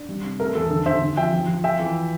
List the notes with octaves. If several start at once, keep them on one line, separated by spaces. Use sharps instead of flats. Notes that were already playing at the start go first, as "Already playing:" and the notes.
Already playing: D4
G3
C3
A3 A#4
E2 A4
D3 A4
D3 C5 E5
D3
F3 E5 G5
F3
F3
F4 E5 G5
E3